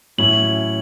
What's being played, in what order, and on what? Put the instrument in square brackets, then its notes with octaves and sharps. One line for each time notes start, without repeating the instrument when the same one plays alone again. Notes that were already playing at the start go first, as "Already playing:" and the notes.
[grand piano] A1 A2 F#3 C#4 E4 [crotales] F#7